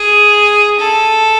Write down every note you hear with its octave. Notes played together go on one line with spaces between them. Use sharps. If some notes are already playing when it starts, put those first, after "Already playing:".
Already playing: G#4
A4